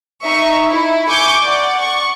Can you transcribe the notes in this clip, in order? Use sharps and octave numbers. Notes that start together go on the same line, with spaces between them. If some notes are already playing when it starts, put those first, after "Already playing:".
D#4 E5 C#6
E4
G#5 C#6 D6 G6
D5 F#5
C#6